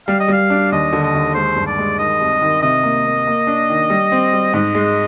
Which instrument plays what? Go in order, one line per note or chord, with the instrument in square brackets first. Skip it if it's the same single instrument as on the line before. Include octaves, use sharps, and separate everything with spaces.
[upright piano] G3 [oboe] F5
[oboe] D#5
[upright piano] G3 [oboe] F5
[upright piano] D4
[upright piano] D#2 [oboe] D#5
[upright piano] D3
[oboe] D#5
[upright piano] D#2
[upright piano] G#3 [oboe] C5
[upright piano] G2
[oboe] D5
[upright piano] G#3
[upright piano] D#3 [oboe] D#5
[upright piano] C2
D#3
[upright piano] C3 [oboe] D#5
[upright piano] A#3
A#3
A#3
D4
D#3
G3
C4
G3
[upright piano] G#2 [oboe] D#5
[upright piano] G#3